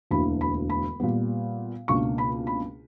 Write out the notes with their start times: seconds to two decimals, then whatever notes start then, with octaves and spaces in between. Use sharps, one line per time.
0.11 E1 D2 D3 A#3 E4 B5
0.41 B5
0.70 B5
1.00 A#2 G3 B3
1.88 C#2 B2 A#3 D4 C#6
2.18 B5
2.47 B5